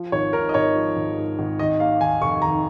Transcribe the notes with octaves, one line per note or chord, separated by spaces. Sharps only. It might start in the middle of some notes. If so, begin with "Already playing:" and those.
Already playing: F3
G#1 C#5
G#2 A#4
D#5
G#1 C#5
F3
G#1
G#2
G#1
D#3 D#5
A#3 F5
D#2 G#5
F1 C#6
D#3 A#5